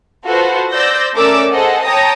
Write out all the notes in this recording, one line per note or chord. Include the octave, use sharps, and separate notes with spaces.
F4 F#4 A4 B4 C5
C5 D5 E6 G6 A#6
A3 C#4 A#4 D5 D6 E6
G#4 A4 C5 D#5 F#5
C#5 G5 A5 A#5 D#6 A#6